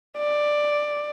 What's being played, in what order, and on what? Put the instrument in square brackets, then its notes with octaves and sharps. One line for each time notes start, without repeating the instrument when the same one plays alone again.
[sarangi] D5